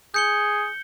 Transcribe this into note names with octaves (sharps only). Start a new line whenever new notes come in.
G#4 G6 C#7 G7